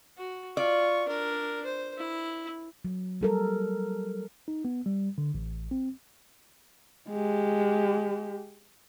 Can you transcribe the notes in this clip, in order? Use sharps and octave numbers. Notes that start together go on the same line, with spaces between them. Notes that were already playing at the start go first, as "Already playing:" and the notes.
F#4
F4 D5 C#6
D4 A#4
C5
E4
F#3
G3 A4 A#4
D#4
B3
G3
D3
A1
C4
G#3 G4